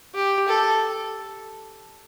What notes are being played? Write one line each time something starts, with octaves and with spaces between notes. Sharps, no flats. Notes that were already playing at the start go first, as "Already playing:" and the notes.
G4
A4